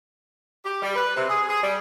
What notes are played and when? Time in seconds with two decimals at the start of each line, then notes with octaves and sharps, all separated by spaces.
0.65 G4
0.82 G3
0.95 B4
1.16 C3
1.29 G#4
1.49 G#4
1.62 G3